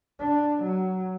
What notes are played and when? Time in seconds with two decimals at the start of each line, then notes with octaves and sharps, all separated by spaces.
0.19 D4
0.63 F#3